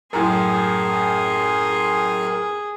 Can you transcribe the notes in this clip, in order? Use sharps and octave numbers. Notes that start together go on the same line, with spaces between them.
F#2 A2 G#4 A#4 G#5 A#5 C6